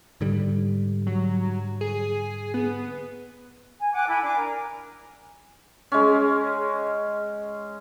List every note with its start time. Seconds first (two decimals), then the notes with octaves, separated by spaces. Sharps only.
0.21 G#2 D3 G3
1.07 F#3
1.81 G#4
2.54 B3
3.80 G#5
3.93 F#5 G#5 D6 F#6
4.08 E4 A4 G#5 B5
4.22 D4 G#5 D6
4.35 A#4
5.92 G#3 C#4